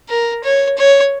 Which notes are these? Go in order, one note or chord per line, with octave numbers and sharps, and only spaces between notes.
A#4
C#5
C#5